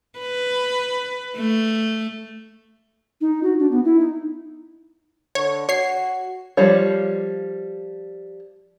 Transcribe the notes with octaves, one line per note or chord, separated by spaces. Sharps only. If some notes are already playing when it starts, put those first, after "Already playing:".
B4
A3
D#4
F#4
D4
B3
E4
D#4
D3 C#5
F#4 C#5 C7
F3 G3 C#5